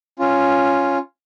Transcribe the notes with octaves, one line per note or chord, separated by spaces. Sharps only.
C#4 F4